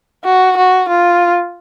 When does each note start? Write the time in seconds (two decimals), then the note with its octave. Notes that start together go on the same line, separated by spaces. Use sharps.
0.24 F#4
0.57 F#4
0.89 F4